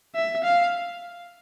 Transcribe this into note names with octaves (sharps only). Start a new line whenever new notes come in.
E5
F5